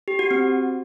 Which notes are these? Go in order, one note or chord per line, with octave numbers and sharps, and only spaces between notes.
G4
F#4
C4